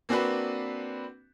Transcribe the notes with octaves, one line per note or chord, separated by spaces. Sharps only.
A#3 C4 D4 F#4 B4